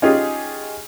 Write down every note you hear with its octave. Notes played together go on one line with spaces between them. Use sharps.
C#4 D#4 F4 G4 G#4